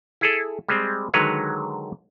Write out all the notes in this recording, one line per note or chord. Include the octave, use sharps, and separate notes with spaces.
E4 G#4 A4
G3 G#3 C4
D3 D#3 F#3 G#3 B4 C#5